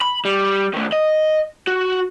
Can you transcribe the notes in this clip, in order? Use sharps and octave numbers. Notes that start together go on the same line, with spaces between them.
B5
G3
D#3 A3
D#5
F#4